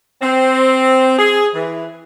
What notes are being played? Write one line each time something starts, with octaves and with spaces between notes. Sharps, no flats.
C4
G#4
E3